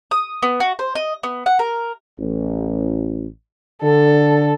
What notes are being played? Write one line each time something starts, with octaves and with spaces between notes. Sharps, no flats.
D#6
B3
F#4
C5
D#5
B3
F#5
A#4
A1
D3 A4